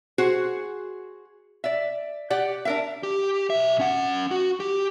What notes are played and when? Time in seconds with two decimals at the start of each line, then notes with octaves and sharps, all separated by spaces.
0.18 F#4 G#4 C5
1.64 D5 E5
2.30 G4 D5 F#5
2.65 D4 A#4 E5
3.03 G4
3.50 B1 E5
3.79 C#4 F#5
4.31 F#4
4.60 G4